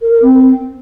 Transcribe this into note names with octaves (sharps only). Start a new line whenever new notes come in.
A#4
A#4
C4